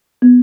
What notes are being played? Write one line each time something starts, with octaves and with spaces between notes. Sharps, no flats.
B3